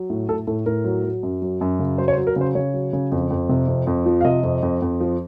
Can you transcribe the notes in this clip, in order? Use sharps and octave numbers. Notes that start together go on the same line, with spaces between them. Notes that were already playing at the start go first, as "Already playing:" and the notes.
Already playing: F#3
A2
A2 A4
A2 A4
A2 A#4
F#3
F#3
F#2
F#3
F#2
C#3
F#3 C5
C#5
C5
F#3
A#4
C#3 C5
C#3 C#5
F#3
C#3
F2
F2
C3
F2
F2
F3
F5
C3 D#5
F2
F2
F2
F3